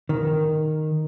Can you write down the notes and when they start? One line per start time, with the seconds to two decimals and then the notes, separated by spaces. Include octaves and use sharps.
0.09 D#3